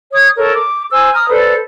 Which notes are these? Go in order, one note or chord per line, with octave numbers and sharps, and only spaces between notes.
C#5 D#6 G#6
A4 A#4 C#5
D6
C5 G#5 E6
A#5 D#6 F6
A4 B4 C5 D5